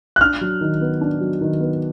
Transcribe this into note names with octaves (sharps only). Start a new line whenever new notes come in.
F#6
D4 F6
F#3
D#3
B3
D4
F#3
D#3
B3